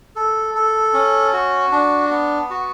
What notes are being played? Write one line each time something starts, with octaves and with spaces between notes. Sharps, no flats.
A4
A4
C#4
F#4
D4
B3
F#4